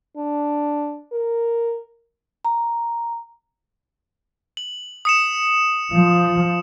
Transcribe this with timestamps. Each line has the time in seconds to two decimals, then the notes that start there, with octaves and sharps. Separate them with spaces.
0.17 D4
1.13 A#4
2.45 A#5
4.57 F#7
5.05 D#6 C#7 E7
5.92 F3